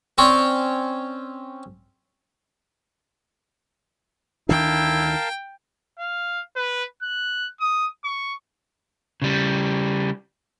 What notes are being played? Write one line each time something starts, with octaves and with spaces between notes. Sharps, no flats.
C4 C#4 C#5 D5
D2 D#3 D4 E4 A#4 F5 G5 A5
F5
B4
F#6
D#6
C#6
C#3 G3